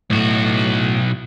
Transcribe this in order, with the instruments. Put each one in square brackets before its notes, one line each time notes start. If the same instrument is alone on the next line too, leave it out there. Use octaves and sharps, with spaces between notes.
[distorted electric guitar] B1 F#4 [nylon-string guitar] A2